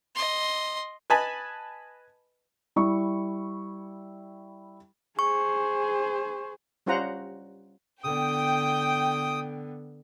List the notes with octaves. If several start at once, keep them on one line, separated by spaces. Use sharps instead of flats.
D#5 C6
B4 D#5 G#5 A5 B5
G3 E4 C#6
G#4 C5 C#6
G3 C#4 F4 C5 F#5 A#5
D3 B3 G5 D#6